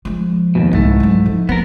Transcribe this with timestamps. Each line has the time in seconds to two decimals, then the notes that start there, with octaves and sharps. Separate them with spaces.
0.05 F3 G#3
0.55 D#2 G#2 B2
0.73 C2 G#2 A3
1.00 F#3 G#3
1.26 F3
1.49 B3 C4 A#4